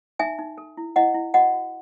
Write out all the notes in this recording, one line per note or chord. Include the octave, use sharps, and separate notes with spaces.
D#4 E5 G#5
D#4
A4
E4
E4 D#5 F#5
E4
F#4 D#5 F#5
F#4